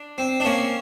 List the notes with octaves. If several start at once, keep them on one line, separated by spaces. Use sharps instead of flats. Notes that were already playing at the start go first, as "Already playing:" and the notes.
Already playing: D4
C4
D4
A#3 C#4